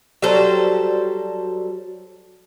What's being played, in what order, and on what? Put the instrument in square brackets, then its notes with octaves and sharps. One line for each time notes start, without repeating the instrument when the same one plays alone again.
[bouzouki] F#3 G3 A4 C5